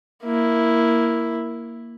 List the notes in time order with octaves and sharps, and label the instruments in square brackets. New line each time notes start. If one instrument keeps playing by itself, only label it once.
[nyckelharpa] A#3 E4